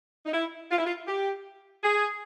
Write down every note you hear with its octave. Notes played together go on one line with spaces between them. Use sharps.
D#4
E4
F4
E4
F4
G4
G#4